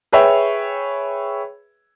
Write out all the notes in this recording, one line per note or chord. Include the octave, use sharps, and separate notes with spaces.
G#4 B4 C#5 E5 G5